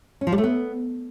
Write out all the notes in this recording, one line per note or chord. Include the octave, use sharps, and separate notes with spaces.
C#4
F3
G3
A3
B3